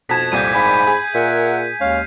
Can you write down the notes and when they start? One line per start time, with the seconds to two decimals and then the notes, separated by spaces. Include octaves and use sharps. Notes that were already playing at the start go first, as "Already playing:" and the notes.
0.09 F2 B2 A5 G#6 B6 E7
0.32 C2 A#2 G3 G6 D#7
0.54 G#2 G#5 B5
0.87 G#4
1.15 A#2 A#4 E5 F#5 B6
1.81 D#2 G#3 C#4 F5